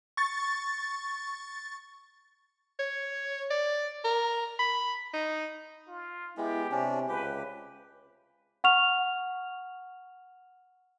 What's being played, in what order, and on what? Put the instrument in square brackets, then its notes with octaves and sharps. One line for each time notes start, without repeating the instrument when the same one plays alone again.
[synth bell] C#6 A6
[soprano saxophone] C#5
D5
A#4
B5
D#4
[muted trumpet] F4
[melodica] G#3 B3 [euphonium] E4 [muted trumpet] G4
[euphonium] C3 [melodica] C#4 D4
[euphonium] C#2 [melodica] G4 [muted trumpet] B4
[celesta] F#5 C#6 F6 F7